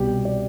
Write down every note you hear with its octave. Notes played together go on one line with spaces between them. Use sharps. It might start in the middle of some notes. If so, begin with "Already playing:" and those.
Already playing: C2 B2 G3 G4
D5